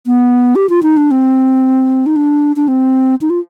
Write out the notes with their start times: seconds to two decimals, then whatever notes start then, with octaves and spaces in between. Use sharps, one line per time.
0.07 B3
0.55 G4
0.70 F4
0.83 D#4
0.97 D4
1.11 C4
2.06 D#4
2.16 D4
2.56 D4
2.68 C4
3.21 D#4
3.30 F4